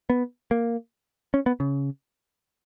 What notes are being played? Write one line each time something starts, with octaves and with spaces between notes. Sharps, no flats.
B3
A#3
C#4
B3
C#3